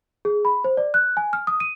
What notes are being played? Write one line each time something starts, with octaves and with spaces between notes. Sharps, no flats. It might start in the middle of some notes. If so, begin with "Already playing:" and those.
G#4
B5
C5
D5
F#6
G#5
F6
D#6
D#7